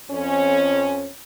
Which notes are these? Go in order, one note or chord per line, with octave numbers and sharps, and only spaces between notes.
F2 C#4